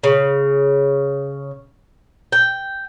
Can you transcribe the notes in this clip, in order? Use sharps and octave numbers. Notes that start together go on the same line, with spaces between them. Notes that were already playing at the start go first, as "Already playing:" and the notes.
C#3
G5